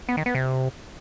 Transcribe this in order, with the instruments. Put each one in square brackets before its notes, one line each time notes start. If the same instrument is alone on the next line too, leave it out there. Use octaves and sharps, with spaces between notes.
[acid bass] B3
D#3
B3
C3